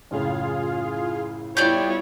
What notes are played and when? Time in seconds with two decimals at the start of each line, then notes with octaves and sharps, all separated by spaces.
0.11 F#2 A2 C#3 F4 G#4 F5
1.57 G3 B3 E4 F4 C#5 D5 G5 G6